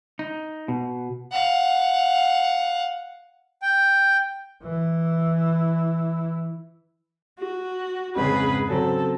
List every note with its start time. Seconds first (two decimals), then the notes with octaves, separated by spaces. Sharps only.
0.19 D#4
0.68 B2
1.31 F5 F#5
3.62 G5
4.63 E3 E4
7.39 F#4
8.15 F2 G#2 C#3 G#4 B4
8.68 C#3 F#3 C4 A4